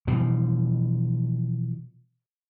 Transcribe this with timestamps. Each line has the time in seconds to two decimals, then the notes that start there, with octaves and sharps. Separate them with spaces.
0.07 B2 E3 F3 G3